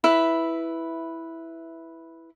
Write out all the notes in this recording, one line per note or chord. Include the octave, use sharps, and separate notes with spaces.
E4 B4 E5